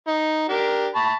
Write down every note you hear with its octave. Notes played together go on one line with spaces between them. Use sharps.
D#4
D4 G4 A#4
A5 B5 C#6